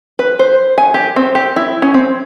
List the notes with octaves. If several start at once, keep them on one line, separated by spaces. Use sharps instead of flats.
B4
C5
G#5
G4
C4
G4
E4
C#4
C4